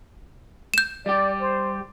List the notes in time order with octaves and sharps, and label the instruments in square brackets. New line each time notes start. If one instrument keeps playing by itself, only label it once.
[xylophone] G6 E7
[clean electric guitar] G3 G4 [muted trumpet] D5
[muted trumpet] C5